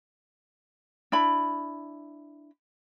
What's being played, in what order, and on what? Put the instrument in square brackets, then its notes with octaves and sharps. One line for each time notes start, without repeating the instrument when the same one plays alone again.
[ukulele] D4 E4 B5